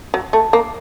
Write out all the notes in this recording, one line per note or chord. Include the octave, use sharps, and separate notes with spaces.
F#3
A3
A#3